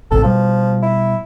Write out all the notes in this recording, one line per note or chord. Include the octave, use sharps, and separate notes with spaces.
A1 G#2 C3 A4
B2 F3 G3
E4